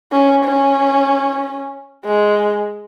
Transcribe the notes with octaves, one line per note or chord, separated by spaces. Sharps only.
C#4
C#4
G#3